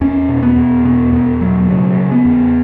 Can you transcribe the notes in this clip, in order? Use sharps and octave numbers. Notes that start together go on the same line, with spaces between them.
E2 C#4
B2
B3
E2
B2 B3
E2 B3
B2 F#3
C#3 F#3
C#3
B3
E2